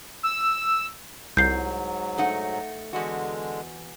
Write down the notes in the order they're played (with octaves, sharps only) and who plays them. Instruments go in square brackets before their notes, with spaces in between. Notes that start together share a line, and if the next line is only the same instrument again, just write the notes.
[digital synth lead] E6
[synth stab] C2 [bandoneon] G#2 F#3 [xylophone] G6 C7
[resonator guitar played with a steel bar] A3 D#4 F#5
[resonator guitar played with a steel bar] E2 F#4 [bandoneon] D3 G#3